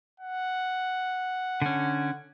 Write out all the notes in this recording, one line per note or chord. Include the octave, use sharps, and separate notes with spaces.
F#5
D3 C#4